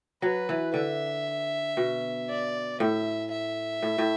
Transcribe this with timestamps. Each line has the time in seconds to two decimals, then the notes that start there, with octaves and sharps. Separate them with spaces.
0.22 F#3 B4
0.49 E3
0.74 D3 E5
1.77 B2
2.29 D5
2.80 A2 E5
3.31 E5
3.83 A2
3.98 A2